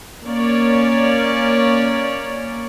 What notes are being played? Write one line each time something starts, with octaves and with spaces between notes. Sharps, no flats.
A#3 C#4 C#5 D5